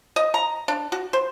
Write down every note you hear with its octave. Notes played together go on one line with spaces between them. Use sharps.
D#5
A#5
D4
F#4
C5